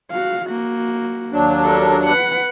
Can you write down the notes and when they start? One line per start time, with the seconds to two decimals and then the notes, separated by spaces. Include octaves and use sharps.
0.11 F#4 F5
0.46 A#3 F#4
1.32 D#2 F#3 D4
1.64 A4 A#4
2.05 B4 F#5